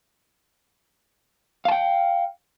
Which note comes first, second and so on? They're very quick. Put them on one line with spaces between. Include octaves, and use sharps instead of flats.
F5 A5 G5